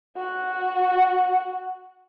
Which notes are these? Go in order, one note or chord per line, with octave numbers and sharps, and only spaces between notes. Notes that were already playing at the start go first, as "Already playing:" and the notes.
F#4 F#5